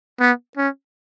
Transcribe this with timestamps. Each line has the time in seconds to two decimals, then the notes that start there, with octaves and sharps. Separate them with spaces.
0.20 B3
0.57 C#4